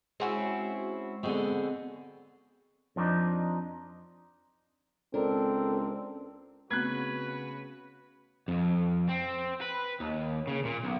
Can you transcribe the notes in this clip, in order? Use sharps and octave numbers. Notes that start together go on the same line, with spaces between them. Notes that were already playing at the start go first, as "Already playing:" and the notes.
G#3 C4 C#4 E4 F#4
B2 D3 C4 G#4
F2 F3 B3 D4 D#4
C#2 C4 D4 A4 A#4
C#3 A3 B3 C4 F#4 B4 F#6 G#6
F2
C4
B4
D#2
C#3
A#2
B1